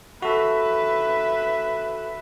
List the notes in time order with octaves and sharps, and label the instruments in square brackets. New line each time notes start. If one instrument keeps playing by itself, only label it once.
[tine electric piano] F#4 A4 [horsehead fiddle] B4 E5